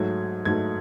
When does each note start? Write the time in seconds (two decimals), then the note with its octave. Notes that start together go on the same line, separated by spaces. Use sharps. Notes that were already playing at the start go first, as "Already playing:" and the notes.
Already playing: G#2 F#3 A3 G#6
0.45 G#2 F#3 A3 G#6